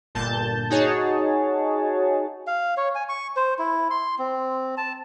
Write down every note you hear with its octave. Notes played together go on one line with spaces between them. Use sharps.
G1 A#2 A5 G6
D#4 F#4 G#4 C#5 A5
F5
C#5
G#5
C#6
C5
E4
C6
C4
A5